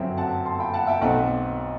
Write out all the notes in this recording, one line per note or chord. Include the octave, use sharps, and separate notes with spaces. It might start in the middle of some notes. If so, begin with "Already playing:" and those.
Already playing: G1 F#2 F#3 C4 E5 G5
F#5 A5
A5 C6
G5 B5
F#5 A5
E5 G5
B1 B2 A3 C4 F#5